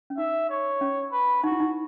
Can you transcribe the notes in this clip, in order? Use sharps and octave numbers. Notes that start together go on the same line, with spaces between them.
C#4
D#4 E5
C#5
C#4
B4
D#4 F#4
E4
D#4